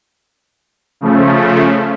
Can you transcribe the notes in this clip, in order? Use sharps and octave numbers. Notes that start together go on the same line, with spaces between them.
C#3 F3 A3